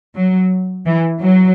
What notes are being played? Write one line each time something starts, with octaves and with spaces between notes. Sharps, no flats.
F#3
E3
F#3